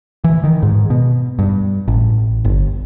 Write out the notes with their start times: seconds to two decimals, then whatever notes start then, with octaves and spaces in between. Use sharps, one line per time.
0.24 E3
0.44 D#3
0.63 G#2
0.90 B2
1.39 G2
1.88 A1
2.45 G1